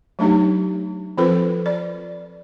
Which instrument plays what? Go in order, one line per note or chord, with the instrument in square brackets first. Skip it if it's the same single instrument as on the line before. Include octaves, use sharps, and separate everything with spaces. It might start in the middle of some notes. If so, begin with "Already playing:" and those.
[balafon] F#3 A3 D4 D#4 G4
F3 C4 F4 A4 B4 C5
D5